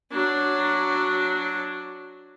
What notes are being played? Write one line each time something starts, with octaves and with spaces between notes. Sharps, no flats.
F#3 D4